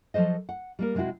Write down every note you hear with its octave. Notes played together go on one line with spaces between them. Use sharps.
F3 F#3 A4 C5 D#5
F#5
G3 A#3 A#4
C3 G#3 C4 E4 F#4